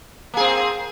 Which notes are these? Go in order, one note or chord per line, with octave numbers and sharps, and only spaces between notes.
A#3 C4 G#4